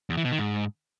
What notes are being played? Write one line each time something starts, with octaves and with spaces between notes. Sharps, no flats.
E2
E3
B2
D#3
G#2